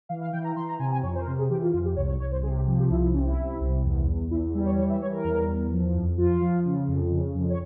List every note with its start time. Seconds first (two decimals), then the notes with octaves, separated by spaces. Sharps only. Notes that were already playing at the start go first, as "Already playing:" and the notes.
0.09 E3 F5
0.21 F5
0.33 E3 G5
0.44 A#5
0.56 E3 C6
0.69 A#5
0.79 C3 G#5
0.92 G#5
1.03 F2 C#5
1.15 C5
1.21 A#4
1.26 C3 C5
1.38 G#4
1.50 E3 G4
1.62 F4
1.73 F2 F4
1.85 G4
1.96 C2 C#5
2.09 C#5
2.20 C2 C#5
2.32 C5
2.43 C3 G#4
2.55 G4
2.67 F3
2.79 G4
2.90 C2 E4
3.02 E4
3.13 C3 C#4
3.25 E4
3.37 C3
3.61 C2
3.84 E2
4.07 E2
4.30 E2 E4
4.54 G3 E4
4.66 C#5
4.78 E3 C#5
4.89 E5
5.01 G3 C#5
5.13 A#4
5.24 E2
5.48 E2
5.71 F3
5.94 F2
6.18 F3 F4
6.41 F3
6.65 C#3
6.88 F2
7.11 C#3
7.35 F2
7.50 C#5